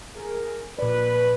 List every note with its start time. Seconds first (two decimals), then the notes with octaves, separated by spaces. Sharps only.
0.16 G#4 A#4
0.79 A#2 B4 D5